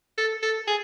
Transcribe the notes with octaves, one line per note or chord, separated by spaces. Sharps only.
A4
A4
G#4